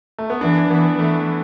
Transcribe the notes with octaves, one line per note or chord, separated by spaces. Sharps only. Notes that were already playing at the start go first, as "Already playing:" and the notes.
A3
B3
E3 D4
E3 B3
E3 A3